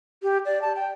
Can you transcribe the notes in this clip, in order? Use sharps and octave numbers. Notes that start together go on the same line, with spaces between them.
G4
D5
A5
G5